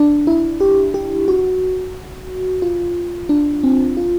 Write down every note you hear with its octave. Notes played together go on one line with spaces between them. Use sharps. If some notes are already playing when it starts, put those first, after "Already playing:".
Already playing: D4
E4
G4
G4
F#4
F4
D4
C4
F4